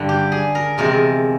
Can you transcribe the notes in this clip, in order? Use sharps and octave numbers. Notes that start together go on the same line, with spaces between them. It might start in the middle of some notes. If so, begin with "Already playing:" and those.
Already playing: G2 D3 G3
G4
G#4
A#4
E2 C3 F3 G#3 A#4